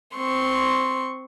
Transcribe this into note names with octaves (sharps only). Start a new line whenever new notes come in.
C4 C6 C#6